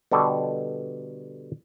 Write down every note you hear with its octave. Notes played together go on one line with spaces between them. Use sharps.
B2 D3 G3 A4